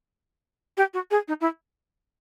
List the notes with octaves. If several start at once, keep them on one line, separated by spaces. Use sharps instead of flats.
G4
F#4
G#4
D#4
E4